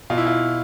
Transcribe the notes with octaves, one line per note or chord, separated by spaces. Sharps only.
B2 F4
E4
F4